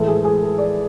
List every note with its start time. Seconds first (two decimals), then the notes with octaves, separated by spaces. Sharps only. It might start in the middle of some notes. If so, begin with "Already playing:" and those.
Already playing: A2 E3 G#3 A4
0.08 G#4
0.25 G#4
0.42 A4
0.58 D5